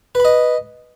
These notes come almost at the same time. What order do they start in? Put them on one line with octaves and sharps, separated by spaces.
B4 B5 D#5